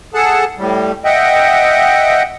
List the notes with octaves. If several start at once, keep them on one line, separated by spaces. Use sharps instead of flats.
G#4 A4 F#5 A5
A2 G3
D#5 E5 F#5 G5